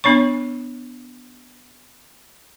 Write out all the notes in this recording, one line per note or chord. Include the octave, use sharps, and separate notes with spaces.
B3 D4 C#5 C#6